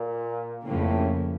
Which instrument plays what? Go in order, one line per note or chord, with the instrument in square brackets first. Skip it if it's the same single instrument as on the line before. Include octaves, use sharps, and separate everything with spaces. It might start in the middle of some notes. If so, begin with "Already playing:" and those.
Already playing: [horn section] A#2
[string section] F2 C#3 F3 A#3 [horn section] A2